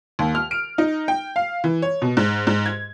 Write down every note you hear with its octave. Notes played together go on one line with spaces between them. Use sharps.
D#2
F6
D7
D#4
G5
F5
E3
C#5
B2
G#2
G#2
G#6